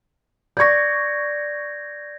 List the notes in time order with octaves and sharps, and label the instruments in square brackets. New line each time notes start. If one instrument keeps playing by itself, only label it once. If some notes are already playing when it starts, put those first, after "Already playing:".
[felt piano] D5 C#6 [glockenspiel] G6 G#6 A#6